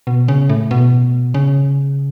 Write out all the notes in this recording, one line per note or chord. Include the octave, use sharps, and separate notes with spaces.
B2
C#3
A2
B2
C#3